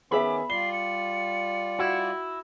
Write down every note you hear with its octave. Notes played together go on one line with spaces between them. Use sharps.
D#3 B3 C#4 G#4 E5 B5 D6
G3 F4 D5 C7 G7
C#7
E4 F#4